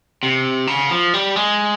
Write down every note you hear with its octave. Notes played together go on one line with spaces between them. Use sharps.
C3
C#3
F3
G3
G#3